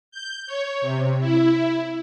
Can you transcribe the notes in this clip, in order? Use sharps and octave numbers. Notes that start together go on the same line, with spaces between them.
G6
C#5
C3
E4